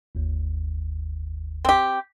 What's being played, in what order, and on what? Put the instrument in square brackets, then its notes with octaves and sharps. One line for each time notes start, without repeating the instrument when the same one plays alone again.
[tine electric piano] G1 D#2
[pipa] C4 G4